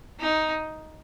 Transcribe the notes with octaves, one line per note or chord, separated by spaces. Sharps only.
D#4